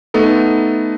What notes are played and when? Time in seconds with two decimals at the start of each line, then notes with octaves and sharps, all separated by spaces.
0.14 A3 B3 D#4 A4